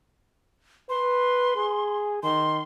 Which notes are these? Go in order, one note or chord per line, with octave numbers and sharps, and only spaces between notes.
B4 C6
G#4
D#3 C6